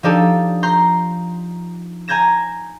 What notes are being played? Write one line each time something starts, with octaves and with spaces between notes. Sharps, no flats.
F3 D4 D#4 G4 A4
A#5 C6 G6
G#5 A#5 G6 G#6 A#6 E7